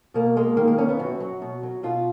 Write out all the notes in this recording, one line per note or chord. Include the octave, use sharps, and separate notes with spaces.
B2 A#3
G#3 A#3
D#3 A#3
A#3
F#2 C#4
B3
F#2 F#4
F#3
B2
F#3
B2 F4